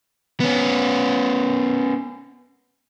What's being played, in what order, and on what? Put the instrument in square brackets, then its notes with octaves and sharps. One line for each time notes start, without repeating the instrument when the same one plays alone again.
[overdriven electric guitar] B3 C#4